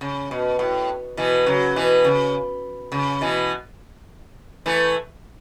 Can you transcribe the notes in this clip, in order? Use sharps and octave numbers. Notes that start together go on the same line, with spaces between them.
C#3
B2
A2
B2 E3
C#3 F#3
B2 E3
C#3
C#3
B2 E3
E3 A3